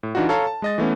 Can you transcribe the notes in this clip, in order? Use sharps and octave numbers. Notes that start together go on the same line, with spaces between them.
A2
E3 D4 D#4 F4 F#4
A4 C#5 F5 A5 A#5
A5
G#3 D#5 A6
E3 A3 B3 C#4